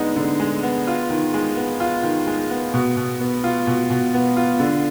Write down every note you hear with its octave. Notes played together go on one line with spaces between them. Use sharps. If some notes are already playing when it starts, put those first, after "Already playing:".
Already playing: D3 G#3 B3 D#4
D3
G#3
B3
F4
D#3
G#3
B3
F4
D#3
G#3
B3
B2
B2
B3
F4
B2
B2
B3
F4
D3